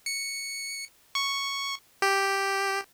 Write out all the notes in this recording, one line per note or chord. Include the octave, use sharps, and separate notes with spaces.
C#7
C#6
G4